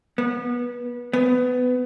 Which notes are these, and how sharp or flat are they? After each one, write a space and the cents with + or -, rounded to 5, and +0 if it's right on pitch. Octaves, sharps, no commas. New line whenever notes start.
B3 -25
B3 +20